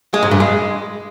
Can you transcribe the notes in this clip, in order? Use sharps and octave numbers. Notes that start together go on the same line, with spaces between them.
G#3
G#2
G2
G#3